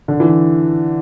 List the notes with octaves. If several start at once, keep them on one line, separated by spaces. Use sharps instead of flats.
D3
E3